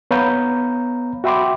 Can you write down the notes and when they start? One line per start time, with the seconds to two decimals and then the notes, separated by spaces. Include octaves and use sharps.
0.11 B3 C#5 F5 A#5 B5 G6
1.24 F#4 E5 G5 B5 C6 D6